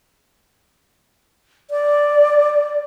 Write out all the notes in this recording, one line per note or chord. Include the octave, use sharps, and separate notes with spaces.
D5